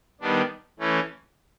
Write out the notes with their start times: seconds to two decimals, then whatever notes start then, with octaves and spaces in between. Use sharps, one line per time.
0.21 D#3 G3 B3 D4
0.79 E3 A3 C#4